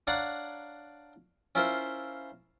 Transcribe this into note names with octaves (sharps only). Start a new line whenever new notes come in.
D4 C#5 D5 F5 F#5 A#5
C#4 E4 F4 A#4 C5